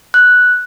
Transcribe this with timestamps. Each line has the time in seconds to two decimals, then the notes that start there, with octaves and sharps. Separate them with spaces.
0.14 F#6